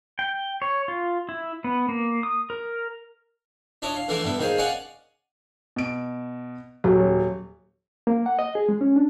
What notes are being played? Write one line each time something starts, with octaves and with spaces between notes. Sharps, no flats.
G5
C#5
F4
E4
B3
A#3
D#6
A#4
D4 E4 C#5 D#5
F5
D3 E3 A3 D4 E4 C6
G2 B3 E4
D#2 D#3 G#4 C5 F5
C#4 D5 D#5 F5 F#5 G#5
B2 D7
D#1 F#3
A#3
F#5
D#5
G#4
G#3
C#4
D4